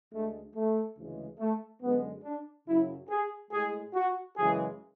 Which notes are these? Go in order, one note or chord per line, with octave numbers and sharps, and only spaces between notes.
D2 D3 G#3 A3
A3
D2 C#3 E3 G#3
A3
F#2 D3 G#3 B3
D4
F#2 C#3 F#3 E4
G#4
A2 G#3 G#4
F#4
F#2 C#3 E3 G#3 G#4